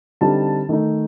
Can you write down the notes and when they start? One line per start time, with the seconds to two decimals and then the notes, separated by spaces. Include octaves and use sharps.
0.21 D3 G3 C4 D#4 A5
0.69 D#3 A3 D#4